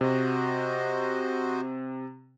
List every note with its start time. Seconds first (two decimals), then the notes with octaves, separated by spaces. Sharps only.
0.01 C3 F#4 C5 D#5